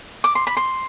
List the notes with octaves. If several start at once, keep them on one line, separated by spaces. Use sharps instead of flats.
D6
C6
B5
C6